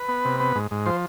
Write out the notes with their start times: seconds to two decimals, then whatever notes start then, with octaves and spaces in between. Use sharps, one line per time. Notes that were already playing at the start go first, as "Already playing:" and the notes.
Already playing: B4
0.09 B3
0.25 C3
0.40 B3
0.55 G#2
0.71 G#2
0.86 F3 C5